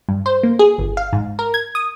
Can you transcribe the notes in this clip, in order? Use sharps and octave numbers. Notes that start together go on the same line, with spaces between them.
G2
C5
A#3
G#4
G1
F5
G#2
A#4
G#6
D#6